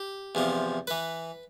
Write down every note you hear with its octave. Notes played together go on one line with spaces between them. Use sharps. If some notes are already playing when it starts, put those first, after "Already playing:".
Already playing: G4
E2 C3 F3
E3 B4